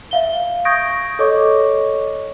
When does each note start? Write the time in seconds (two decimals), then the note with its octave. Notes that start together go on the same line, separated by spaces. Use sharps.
0.11 E5 F5 G7
0.65 C#6 D#6 G6 G#6 A#6 D7
1.19 A4 C#5 D#5 C#6 D6